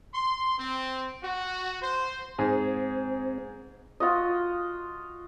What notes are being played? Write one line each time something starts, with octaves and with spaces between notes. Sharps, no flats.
C6
C4
F#4
C5
G#2 C4 G#4
F4 F#4 D#5